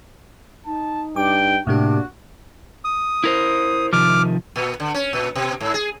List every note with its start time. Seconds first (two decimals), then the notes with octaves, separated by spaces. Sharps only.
0.66 D#4 A5
1.16 G2 G5 D6
1.67 A2 C3 A#3 D4 F#4 G4
2.85 D#6
3.24 E4 A#4 C5
3.93 C3 D#3 F3 D6 F6
4.56 A#2
4.80 D3
4.94 C#4
5.13 A#2
5.35 B2
5.61 G#2
5.74 G#4